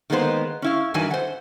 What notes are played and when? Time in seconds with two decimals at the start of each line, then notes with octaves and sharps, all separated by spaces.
0.10 D#3 G#3 A#3 B3 C5
0.62 C#4 E4 F5
0.94 G2 D#3 E3 F#3 G#5
1.11 C5 F#5